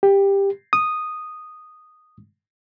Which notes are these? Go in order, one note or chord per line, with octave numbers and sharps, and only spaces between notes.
G4
D#6